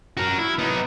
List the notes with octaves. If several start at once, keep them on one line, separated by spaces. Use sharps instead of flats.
F#4 A#4
E4
B3 D#4